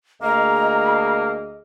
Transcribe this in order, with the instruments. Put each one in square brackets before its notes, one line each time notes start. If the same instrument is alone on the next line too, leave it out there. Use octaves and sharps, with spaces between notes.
[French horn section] D2 G#4 D#5 [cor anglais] A#3 [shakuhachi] A#5